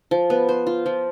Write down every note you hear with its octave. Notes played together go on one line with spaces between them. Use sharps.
F3
B3
C5
F4
F3